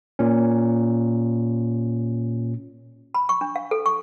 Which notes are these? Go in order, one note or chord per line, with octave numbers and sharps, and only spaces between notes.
A#2 C#4
B5
C#6
D4
F5
A4
C#6